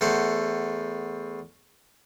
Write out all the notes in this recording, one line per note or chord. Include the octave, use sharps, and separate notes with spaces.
E2 A3 C5 F#5